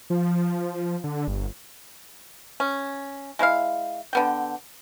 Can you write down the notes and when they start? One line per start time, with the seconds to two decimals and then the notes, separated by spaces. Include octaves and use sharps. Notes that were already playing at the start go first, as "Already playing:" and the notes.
0.10 F3
1.04 D3
1.28 G1
2.60 C#4
3.39 G#3 E4 B4 F5
4.13 D3 B3 G5